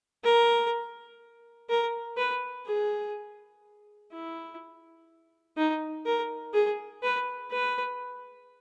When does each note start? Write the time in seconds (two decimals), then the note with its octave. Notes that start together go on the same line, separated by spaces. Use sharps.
0.24 A#4
1.69 A#4
2.17 B4
2.66 G#4
4.12 E4
5.57 D#4
6.06 A#4
6.54 G#4
7.03 B4
7.51 B4